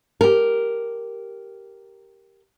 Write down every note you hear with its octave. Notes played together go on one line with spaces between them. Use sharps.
G4 A#4